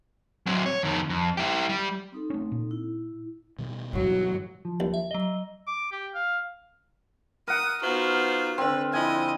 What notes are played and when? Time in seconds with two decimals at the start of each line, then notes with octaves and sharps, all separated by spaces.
0.46 F#3 C4
0.66 C#5
0.83 F2 D#3
1.09 F2
1.37 E4 G4
1.69 G3
2.12 C4 D#4 A4
2.30 A3 C#4
2.52 A#2
2.71 E4
3.59 B2 D#3 G3
3.93 G2 E3 F#3
4.65 F3
4.80 D#2
4.94 E5
5.11 F#3 D#5 G7
5.67 D6
5.92 G4
6.15 F5
7.48 A#4 F#5 D#6
7.82 B3 D#4 F4 F#4 C5
8.58 D3 C4 B4
8.93 F3 E4 D#5 G#5